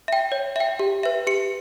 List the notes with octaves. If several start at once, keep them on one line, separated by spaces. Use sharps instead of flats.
E5 G5
C#5
E5 G5
G4
B4 E5
G4 C#7